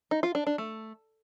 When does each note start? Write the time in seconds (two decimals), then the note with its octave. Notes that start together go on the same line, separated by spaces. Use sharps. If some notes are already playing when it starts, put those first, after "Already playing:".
0.11 D#4
0.23 F4
0.35 D4
0.47 D4
0.58 A3